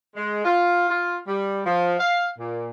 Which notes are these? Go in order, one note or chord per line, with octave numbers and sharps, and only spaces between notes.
G#3
F4
F4
G3
F3
F5
A#2